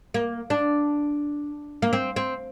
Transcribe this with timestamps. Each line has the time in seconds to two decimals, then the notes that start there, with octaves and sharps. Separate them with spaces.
0.14 A#3
0.50 D4
1.82 A#3
1.93 C4
2.16 C4